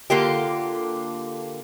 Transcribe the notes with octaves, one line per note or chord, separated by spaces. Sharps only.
D3 A#3 F4 G4